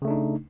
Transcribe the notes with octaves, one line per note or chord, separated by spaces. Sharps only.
C#3 A3 D4 D#4